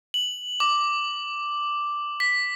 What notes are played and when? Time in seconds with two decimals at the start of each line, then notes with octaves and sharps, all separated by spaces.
0.14 F#7
0.60 D6
2.20 B6